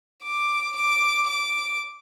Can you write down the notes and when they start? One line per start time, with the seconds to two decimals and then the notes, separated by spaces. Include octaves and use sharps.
0.24 D6
0.76 D6
1.28 D6